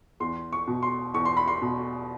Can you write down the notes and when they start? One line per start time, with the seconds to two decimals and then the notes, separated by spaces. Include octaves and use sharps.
0.20 E2 C6
0.53 C#6
0.67 B2
0.83 C6
1.14 E2 C#6
1.25 C6
1.37 B5
1.48 C6
1.62 B2